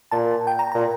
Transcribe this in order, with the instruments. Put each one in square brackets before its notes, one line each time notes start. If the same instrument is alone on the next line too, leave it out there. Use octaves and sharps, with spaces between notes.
[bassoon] A#2 [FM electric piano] A5
[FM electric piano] G5
A#5
[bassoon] A#2 [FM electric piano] A#5